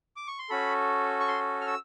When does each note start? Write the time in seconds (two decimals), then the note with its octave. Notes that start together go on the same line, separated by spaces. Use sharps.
0.16 D6
0.28 C#6
0.39 C6
0.49 C#4 F#4 A4 B5
1.20 C#6
1.28 C6
1.61 F6
1.67 E6